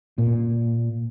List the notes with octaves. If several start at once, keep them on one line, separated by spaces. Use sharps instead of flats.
A#2